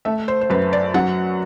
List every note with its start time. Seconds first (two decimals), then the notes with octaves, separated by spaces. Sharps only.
0.05 A3 E5
0.28 C5
0.41 C5
0.50 F#2 B4
0.73 D5
0.94 F#3 F#5